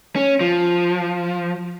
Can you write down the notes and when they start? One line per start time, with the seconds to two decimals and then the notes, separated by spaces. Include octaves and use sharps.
0.16 C#4
0.41 F3